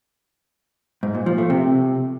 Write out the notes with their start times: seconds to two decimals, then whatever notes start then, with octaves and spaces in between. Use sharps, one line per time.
1.03 G#2
1.15 A#2
1.26 F3
1.38 A3
1.50 C3